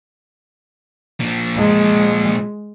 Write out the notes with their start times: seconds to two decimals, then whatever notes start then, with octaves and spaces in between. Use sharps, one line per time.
1.20 A#2 F3
1.58 G#3